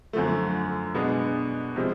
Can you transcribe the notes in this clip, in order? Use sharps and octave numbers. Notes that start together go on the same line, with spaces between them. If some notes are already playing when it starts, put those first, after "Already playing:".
F#2 D3 F3 A3
B2 G#3 B3 D4
C3 F3 G#3